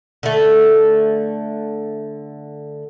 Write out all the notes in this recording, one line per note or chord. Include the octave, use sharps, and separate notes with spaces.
D3 A3